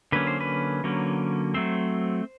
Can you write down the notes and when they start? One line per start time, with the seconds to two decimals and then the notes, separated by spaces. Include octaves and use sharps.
0.12 D3 F#3 A#3 C#4 B4
0.27 C5
0.40 B4
0.84 D3 F#3 A#3 C#4
1.54 F#3 A3 C4 C5